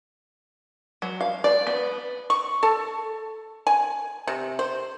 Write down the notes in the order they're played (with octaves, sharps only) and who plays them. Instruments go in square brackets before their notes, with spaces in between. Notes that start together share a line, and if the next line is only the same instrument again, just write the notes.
[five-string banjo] F#3
F5
D5
B3
[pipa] C#6
A4
G#5
C3
C5